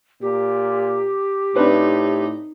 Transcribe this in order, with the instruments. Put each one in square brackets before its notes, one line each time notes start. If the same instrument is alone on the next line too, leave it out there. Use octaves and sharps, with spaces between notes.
[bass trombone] A#2 [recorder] G4
[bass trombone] A2 [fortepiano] C4 D4 B4 [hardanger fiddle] D#4